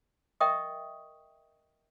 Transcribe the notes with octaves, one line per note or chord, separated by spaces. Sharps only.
A#4 D#5 E5 G5 C#6 D#6